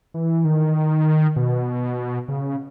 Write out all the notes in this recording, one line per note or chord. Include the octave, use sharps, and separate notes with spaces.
E3
D#3
B2
C#3